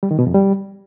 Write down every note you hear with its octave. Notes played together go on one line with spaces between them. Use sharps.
G3
D#3
B2
F2
G3